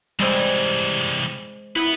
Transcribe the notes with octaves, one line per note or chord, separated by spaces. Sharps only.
C3 E3 G3 G#3 C4
E4 B4 F#5